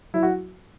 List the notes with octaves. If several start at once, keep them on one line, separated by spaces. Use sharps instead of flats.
F#3 E4
F#4